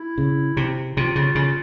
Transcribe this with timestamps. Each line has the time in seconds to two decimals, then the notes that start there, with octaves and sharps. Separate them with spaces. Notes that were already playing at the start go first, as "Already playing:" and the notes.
Already playing: E4
0.18 C#3
0.57 C3
0.96 C3 F4
1.16 C#3
1.35 C#3